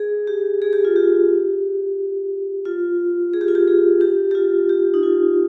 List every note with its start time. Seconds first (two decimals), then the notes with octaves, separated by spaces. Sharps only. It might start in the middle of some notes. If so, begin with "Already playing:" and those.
Already playing: G#4
0.27 G4
0.62 G#4
0.73 G4
0.85 F4
0.96 G4
2.65 F4
3.34 G#4
3.41 G4
3.48 F4
3.55 G4
3.68 G#4
4.01 G4
4.31 G4
4.35 F4
4.69 G4
4.94 D#4
5.03 F4